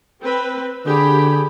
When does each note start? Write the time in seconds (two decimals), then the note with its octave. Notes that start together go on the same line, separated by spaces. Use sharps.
0.22 C4 B4
0.86 D3 G4 G#4 B5